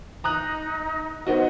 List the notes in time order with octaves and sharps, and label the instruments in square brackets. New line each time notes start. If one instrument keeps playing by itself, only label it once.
[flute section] D#4 [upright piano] A#5 D#6 F#6
[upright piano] B3 D#4 F#4 [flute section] C5 D#5 F#5